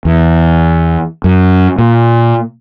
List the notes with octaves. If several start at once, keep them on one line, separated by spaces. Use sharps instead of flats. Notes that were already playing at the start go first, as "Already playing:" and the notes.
E2
F#2
A#2